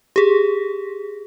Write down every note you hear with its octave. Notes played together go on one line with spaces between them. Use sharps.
G4 G#4